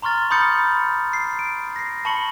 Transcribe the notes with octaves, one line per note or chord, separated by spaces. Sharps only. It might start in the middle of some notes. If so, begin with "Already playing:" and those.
A#5 C6 C#6 F6 A6
B5 C6 D#6 G6 A6 C#7
C7
D7
A#6 C7
A5 B5 C#6 C#7 F#7